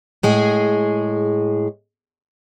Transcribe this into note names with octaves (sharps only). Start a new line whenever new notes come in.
A2 G#3 G#4